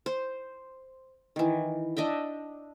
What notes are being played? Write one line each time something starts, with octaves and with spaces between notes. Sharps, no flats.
C5
D#3 E3
D4 D#5 E5 G5